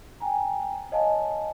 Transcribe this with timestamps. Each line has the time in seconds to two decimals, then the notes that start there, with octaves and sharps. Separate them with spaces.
0.20 G5 G#5 A#5
0.92 C#5 D#5 F5 G#5 A5